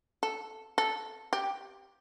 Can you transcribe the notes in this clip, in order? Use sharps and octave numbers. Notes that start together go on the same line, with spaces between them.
A4
A4
G4